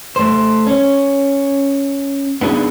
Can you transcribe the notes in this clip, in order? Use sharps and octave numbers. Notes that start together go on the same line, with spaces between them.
A3 C5
C#4
B3 D4 D#4 G#4